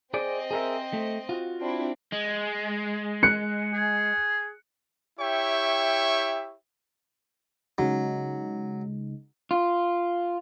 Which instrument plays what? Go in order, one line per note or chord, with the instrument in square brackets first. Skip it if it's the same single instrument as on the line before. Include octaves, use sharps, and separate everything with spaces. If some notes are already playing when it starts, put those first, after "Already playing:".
[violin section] C4 D#5 [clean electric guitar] G#4 C5 D5
[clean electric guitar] G#4 A#4 E5
A3
F4 F#4
[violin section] C4 D4 E4
[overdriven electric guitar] G#3
[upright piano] F#6 C#7
[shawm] G#4
[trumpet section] E4 G4 C#5 E5 G5 C#6
[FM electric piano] C#3 G#3 D#4 [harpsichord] F#3
[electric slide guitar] F4